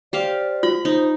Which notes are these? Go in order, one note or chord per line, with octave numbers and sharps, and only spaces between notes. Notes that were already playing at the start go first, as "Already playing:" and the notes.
G4 C5 D5 F5
F4 B5
D#4 C5